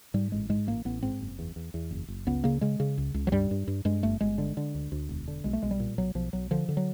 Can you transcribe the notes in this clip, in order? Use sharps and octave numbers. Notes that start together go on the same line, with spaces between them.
G#2 G3
A1 G#3
G#2 G#3
A1 A#3
A1 B3
G#2 C4
F#1
E2
E2
E2
F#1
F#1
C#2 B3
C#3 A#3
C#3 G#3
C#3
C#2
C#2
F#3
G2 G3
G2
G2
G2 G#3
G1 A3
G1 G#3
D3
D3
D2
D2
E1
D3
B1 G#3
A3
B1 G#3
G3
A#2
B1 F#3
B1 F3
B1 F#3
D3 F3
D3
F#3